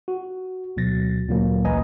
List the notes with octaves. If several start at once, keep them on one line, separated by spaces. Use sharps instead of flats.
F#4
D2 B2 F#3 A6 A#6
D2 A#2 C#3 F#3 A#3
A1 D2 B4 D#5 G#5 A#5